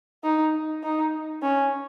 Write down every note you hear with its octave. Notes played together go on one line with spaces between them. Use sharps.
D#4
D#4
C#4